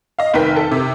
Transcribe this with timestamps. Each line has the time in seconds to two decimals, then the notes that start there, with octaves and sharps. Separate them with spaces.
0.19 D#5 F5
0.34 F1 D#3 A#4 B4 G5 B6
0.56 A4
0.72 C3